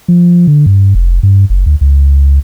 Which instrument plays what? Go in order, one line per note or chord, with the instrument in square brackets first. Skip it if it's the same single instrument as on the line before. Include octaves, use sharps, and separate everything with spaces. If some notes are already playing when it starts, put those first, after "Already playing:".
[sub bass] F3
D3
G2
F1
G2
F#1
D2
C#2